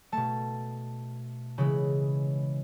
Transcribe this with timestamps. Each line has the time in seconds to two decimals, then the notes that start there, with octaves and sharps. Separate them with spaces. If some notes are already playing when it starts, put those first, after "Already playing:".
0.12 B2 A3 A5
1.58 C#3 E3 G#3 B5